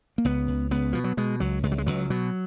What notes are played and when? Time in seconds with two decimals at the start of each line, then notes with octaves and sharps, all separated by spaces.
0.18 A#3
0.25 C#2 B3
0.48 C#2
0.71 C#2 B3
0.93 B2 F3
1.04 F#3
1.17 B2 G#3
1.40 C#2 F#3
1.63 C#2 G#3
1.72 F#3
1.78 G#3
1.86 C#2 F#3
2.10 B2 F#3